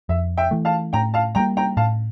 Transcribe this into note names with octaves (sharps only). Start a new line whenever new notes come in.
F2 E5
E5 G5
E3 A3
F5 A5
A2 G5 A#5
F5 A5
G3 A#3 G5 A#5
G5 A#5
A2 F5 A5